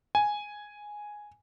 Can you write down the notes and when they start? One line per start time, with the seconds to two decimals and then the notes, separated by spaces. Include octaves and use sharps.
0.15 G#5